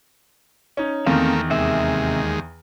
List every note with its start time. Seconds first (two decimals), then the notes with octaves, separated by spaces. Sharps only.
0.77 C#4 D#4
1.06 E2 D#3 A3 A#3 C4 F5
1.50 D#2 C3 G#3 E5